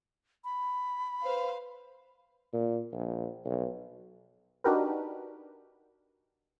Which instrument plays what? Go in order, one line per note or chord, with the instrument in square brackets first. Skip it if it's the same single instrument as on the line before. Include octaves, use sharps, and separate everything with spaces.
[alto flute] B5
[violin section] B4 C5 F5
[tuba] A#2
A#1
B1
[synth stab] D4 D#4 F#4 G4 A#4 B4